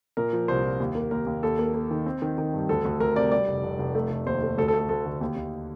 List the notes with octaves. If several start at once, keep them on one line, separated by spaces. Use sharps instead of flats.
A#2 A#4
F3
C2 C5
F3
D#2
A#3
D#2 A#4
D#2
D#2 A4
A#3
A#3
D#3
C4
D#3
D#3
G2
D2 A4
D2
D2 A#4
C3 D5
G3 D5
F1
F1
F1
A3
F1
D#2 C5
A3
D2 A4
A4
A3
A4
D2 A4
D3
D#2
D#2